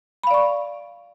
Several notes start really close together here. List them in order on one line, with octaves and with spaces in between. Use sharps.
B5 F5 D5 C#6